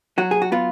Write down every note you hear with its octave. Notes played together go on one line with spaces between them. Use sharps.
F#3 F#4
G#4
F#4
B3 F4